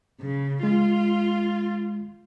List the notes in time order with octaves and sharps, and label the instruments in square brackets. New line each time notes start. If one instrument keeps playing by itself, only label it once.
[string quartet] C#3
[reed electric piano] G#3 [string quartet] F4